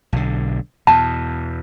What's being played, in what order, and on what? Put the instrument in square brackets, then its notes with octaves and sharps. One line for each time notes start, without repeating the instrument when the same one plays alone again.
[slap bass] B1 D3
[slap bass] E2 B2 [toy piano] A5